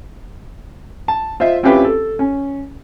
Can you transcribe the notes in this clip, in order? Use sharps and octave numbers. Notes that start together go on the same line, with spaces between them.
A5
F4 C5 D#5 E5
C4 C#4 E4 F4 G4 B4
A4
C#4